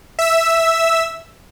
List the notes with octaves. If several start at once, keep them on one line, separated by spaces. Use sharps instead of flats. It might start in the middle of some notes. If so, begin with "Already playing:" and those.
E5 E6